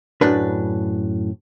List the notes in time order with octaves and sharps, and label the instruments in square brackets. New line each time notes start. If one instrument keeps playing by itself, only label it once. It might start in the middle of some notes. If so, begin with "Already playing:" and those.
[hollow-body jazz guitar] F#2 A2 D4 B4